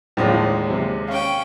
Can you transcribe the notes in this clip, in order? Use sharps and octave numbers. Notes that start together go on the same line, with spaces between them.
D#2 A2 D3 F3 G#3 A#3 F4 D#6
C3
C#4 F5 G5